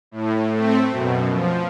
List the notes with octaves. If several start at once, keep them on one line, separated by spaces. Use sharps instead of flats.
A2
A3 C4
F#2 B2
F3